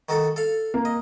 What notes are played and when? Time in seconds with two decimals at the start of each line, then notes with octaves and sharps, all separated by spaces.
0.09 D#3 F#4 A4
0.36 A4 F5
0.74 A#3
0.85 D#5